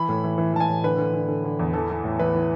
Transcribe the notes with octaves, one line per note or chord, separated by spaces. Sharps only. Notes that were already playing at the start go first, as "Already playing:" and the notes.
Already playing: E3 B5
A2
E3
E3
E3 A5
G#5
A2
D3 B4
D3
D3
D3
D3
E2
E3 A4
E3
A2
E3 B4
E3